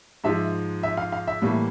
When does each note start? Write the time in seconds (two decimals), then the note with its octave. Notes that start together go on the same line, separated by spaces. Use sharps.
0.24 G#2 F3 G#3 E5
0.83 E5
0.97 F5
1.12 F5
1.27 E5
1.42 A2 E3 G3 A#3